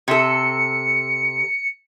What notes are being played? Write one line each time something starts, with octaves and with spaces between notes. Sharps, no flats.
C3 A4 C#7